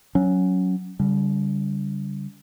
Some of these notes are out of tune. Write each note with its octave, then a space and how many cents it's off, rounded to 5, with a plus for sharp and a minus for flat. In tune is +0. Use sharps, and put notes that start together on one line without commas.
F#3 +0 C#4 +0
D3 -45 G3 +0